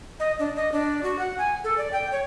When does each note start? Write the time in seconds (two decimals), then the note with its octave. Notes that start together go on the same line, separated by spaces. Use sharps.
0.20 D#5
0.39 D4
0.56 D#5
0.72 D4
1.03 F#4
1.19 F#5
1.38 G#5
1.64 A4
1.78 D5
1.92 G5
2.12 C#5